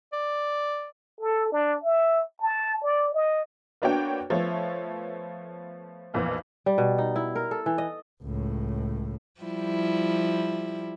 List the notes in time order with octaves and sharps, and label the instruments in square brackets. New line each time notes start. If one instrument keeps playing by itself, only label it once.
[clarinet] D5
[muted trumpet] A4
D4
E5
A5
D5
D#5
[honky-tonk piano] A#3 B3 D4 F#4 C#5 G5
F3 A3 B3 C#5
B1 F2 A#2 E3 B3
[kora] G3
B2
D#4
E4
A#4
A4
E3
D#5
[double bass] C#2 A2
[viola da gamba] F3 G3 E4